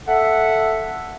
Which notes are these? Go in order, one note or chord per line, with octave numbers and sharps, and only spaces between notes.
A4 E5 F#5